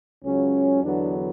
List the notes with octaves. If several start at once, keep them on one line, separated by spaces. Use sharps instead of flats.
C#2 C#3 F#3 C#4
E2 D3 F#3 B3 D4